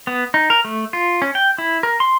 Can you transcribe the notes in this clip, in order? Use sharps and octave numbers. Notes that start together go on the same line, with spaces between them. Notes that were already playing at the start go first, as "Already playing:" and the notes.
B3
D#4
A#4
A3
F4
C#4
G5
E4
A#4
C6